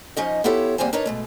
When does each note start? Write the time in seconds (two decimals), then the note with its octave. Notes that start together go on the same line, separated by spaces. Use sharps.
0.17 F3 C#4 D#4 D#5
0.44 B3 E4 F4 G4 A4 C#5
0.78 E2 G3 A#3 C4 C5 G#5
0.93 D4 D#4 A#4 B4 C#5 D#5
1.06 B2 G#3 A3